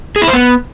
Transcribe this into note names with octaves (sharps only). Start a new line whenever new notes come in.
G#4
E4
C5
B3